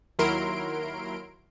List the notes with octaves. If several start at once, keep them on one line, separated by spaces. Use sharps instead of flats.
D#2 F#3 E4 A#4 C6 D7